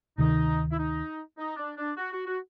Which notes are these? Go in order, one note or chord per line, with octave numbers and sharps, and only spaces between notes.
D2 C3 D#3 D#4
E4
D#4
D#4
D4
D4
F#4
F#4
F#4